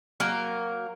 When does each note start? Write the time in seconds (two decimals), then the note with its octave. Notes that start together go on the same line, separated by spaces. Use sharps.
0.20 F#3 A#3 A#4